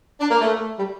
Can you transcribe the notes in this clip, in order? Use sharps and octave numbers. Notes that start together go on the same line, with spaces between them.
D4
A#3
A3
G3